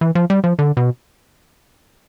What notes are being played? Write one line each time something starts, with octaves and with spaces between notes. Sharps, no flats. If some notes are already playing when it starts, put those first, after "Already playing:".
E3
F3
G3
F3
D3
B2